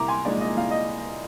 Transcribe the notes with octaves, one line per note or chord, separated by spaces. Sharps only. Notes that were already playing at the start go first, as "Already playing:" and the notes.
Already playing: C2 A#5 D6
G#5 C6
A#2 F3 G#3 D#4 D5
D#5
C2 F5
D#5